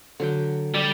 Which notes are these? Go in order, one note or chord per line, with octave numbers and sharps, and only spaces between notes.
D3 F#3 G5
G3